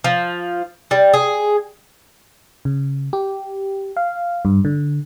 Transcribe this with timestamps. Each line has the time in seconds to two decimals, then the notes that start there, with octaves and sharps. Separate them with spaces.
0.04 F3
0.91 G3
1.14 G#4
2.65 C#3
3.13 G4
3.97 F5
4.45 G2
4.65 D3